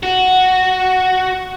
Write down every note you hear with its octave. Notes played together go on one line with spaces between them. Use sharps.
F#4